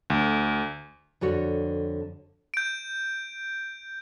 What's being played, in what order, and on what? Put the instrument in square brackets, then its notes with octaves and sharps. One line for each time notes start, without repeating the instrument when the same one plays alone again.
[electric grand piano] D2
[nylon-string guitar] F2 D3 F#4 C#5
[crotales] G6 D7